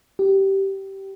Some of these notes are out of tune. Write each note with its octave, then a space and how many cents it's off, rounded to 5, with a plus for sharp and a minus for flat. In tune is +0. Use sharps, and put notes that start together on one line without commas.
G4 -15